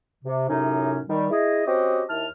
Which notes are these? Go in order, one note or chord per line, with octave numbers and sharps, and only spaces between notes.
C3
F#2 A2 C3 C#4 D#4
D#3 G3
E4 G#4 D#5
C4 C#4 F#4 G4 D#5
D#2 E4 A5 F6